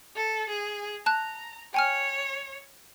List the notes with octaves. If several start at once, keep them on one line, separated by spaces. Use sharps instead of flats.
A4
G#4
A5 A#5 F#6
C#5 G5 G#5 F6